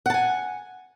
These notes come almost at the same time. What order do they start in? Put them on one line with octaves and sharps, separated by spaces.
F#5 A5 G#5